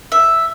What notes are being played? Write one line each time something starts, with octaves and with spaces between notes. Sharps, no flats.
E5